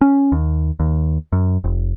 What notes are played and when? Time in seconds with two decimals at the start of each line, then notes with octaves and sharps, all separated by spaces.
0.01 C#4
0.32 D#2
0.80 D#2
1.32 F#2
1.64 F1